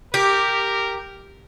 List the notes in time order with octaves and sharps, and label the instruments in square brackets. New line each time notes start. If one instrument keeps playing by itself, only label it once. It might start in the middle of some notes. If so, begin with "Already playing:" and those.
[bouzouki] G4 [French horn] A#4